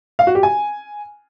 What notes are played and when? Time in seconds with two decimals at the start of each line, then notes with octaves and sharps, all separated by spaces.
0.19 F5
0.27 F#4
0.35 G4
0.43 G#5